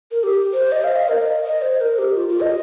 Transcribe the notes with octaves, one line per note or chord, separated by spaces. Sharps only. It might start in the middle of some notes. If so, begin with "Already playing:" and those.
A#4
G4
C5
D#5
F5
D#5
A#4
D#5
D#5
C5
A#4
G4
F4
F4
D#5